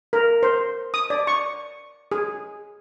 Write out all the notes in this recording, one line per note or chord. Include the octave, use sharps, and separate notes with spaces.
A#4
C5
D#6
D5
C#6
G#4